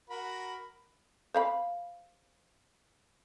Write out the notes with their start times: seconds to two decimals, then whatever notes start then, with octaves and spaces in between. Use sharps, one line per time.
0.10 F#4 A#4 B5
1.34 C5 F5 B5